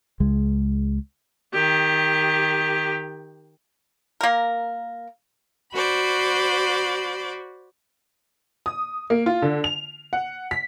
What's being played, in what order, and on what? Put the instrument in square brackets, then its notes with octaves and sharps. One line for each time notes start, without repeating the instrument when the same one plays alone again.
[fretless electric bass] C#2 G#3
[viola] D#3 G4
[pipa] A#3 A#4
[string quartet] F#4 C5 D5 B5
[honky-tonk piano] D#6
A#3
F4
D3
F7
F#5
B6